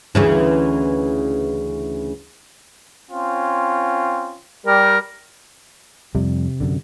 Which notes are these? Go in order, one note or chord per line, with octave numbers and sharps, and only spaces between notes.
D2 C#3 E3
C4 C#4 F4
G3 A#4
F2 C3 G3
F#2 D3